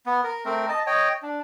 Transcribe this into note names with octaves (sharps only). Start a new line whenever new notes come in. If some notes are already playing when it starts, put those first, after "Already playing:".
B3
A#4
A3 C4 A#4
D#5 A5
C#5 D#5 G5
D4